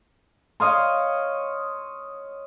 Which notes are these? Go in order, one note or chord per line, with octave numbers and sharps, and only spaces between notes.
C#5 D#5 F5 C6